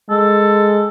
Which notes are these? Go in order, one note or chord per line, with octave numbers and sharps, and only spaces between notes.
G#3 A4